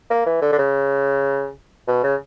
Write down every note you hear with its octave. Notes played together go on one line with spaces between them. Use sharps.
A#3
E3
D3
D3
C#3
B2
C#3